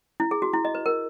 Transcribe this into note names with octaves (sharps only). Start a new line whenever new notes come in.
E4
G#4
F#4
E4
D#5
B4
A#4